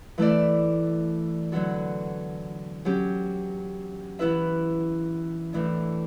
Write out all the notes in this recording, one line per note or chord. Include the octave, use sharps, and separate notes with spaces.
E3 A3 E4 A4 D5
D3 F#3 B3 F#4 A4
F#3 C#4 G4
E3 B3 E4 B4 E5
A2 E3 A3 D4